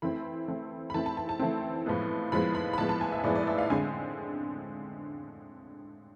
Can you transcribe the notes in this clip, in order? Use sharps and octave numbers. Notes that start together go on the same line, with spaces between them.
E3 A3 C4 B5
E3 A3 C4
B5
E3 A3 C4 A5
A5
A5
A5
E3 A3 C4
A2 F3 G#3 B3
A2 F3 G#3 B3 B5
B5
B5
A2 F3 G#3 B3 A5
A5
G#5
E5
A2 F3 G#3 B3 D5
D5
E5
F5
D3 G#3 C4 G#5